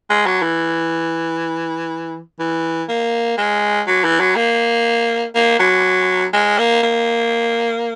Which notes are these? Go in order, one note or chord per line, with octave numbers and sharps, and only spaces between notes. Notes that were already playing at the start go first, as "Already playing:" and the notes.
G#3
F#3
E3
E3
A#3
G#3
F#3
E3
F#3
A#3
A#3
F#3
G#3
A#3
A#3